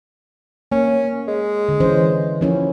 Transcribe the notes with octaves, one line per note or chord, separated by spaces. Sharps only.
A#3 C#4
G#3
D3
E3 C#4 C5
D#2 F3 C#4 E4